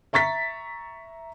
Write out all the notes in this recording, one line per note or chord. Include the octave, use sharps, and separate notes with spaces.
E5 A#5 C#6 A6 B6